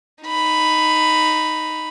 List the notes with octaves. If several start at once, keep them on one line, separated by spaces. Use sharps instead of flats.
D#4 B5